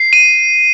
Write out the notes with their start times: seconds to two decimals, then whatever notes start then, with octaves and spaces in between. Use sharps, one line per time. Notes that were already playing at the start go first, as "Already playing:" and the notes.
Already playing: C7
0.13 D#7